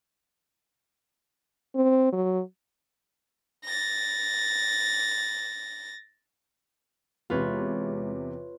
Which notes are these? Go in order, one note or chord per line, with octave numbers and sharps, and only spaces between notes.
C4
F#3
A6 A#6
E2 C3 G#3 F4 B4 C#5